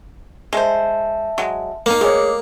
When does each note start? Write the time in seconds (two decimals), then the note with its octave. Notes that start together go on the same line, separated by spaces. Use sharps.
0.53 G#3 C5 E5 A5
1.38 F#3 G#3
1.86 A#3 D#4 F5
2.01 G#3 A3 G#4 C#5 D6